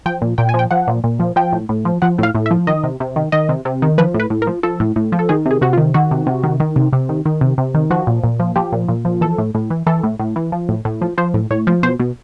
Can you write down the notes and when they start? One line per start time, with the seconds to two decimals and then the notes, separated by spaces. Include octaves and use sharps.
0.06 F3 G5
0.22 A#2
0.38 A#2 G5
0.49 G#5
0.54 F3
0.59 G5
0.71 F3 F#5
0.88 A#2
1.04 A#2
1.20 F3
1.36 F3 G5
1.52 A2
1.69 A2
1.85 F3
2.02 F3 F#5
2.18 A2 F5
2.35 A2
2.46 E5
2.51 F3
2.67 D#3 D#5
2.84 C3
3.00 C3
3.16 D#3
3.32 D#3 D#5
3.49 C3
3.65 C3
3.82 D#3
3.98 F3 B4
4.14 A2
4.20 B4
4.30 A2
4.42 A#4
4.47 F3
4.63 F3 A4
4.80 A2
4.96 A2
5.12 F3
5.19 A4
5.29 D#3 G#4
5.46 C3
5.51 G#4
5.61 C3 F#4
5.73 F4
5.78 D#3
5.94 D#3 F#4
6.11 C3
6.27 C3
6.44 D#3
6.60 D#3
6.76 C3
6.93 C3
7.09 D#3
7.25 D#3
7.41 C3
7.58 C3
7.74 D#3
7.90 F3 F#4
8.07 A#2
8.24 A#2
8.40 F3
8.56 F3 G4
8.72 A#2
8.89 A#2
9.05 F3
9.21 E3 A4
9.38 A2
9.55 A2
9.70 E3
9.87 E3 A4
10.03 A2
10.19 A2
10.36 E3
10.52 F3
10.69 A2
10.85 A2
11.01 F3
11.18 F3 C5
11.34 A2
11.51 A2 C#5
11.67 F3
11.83 B2 C5
12.00 B2